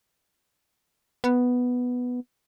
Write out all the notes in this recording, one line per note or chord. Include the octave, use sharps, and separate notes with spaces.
B3